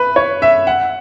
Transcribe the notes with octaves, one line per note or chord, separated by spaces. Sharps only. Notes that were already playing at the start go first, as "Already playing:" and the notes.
Already playing: B4
C#5
E5
F#5